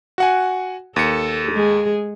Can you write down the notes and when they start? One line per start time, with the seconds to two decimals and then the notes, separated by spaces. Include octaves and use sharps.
0.18 F#4 F#5 G#5
0.96 D#2 A4 C#7
1.52 G#3 G#4